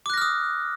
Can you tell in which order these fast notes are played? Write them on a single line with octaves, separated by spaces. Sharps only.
D6 F#6 A#6 F6 D#6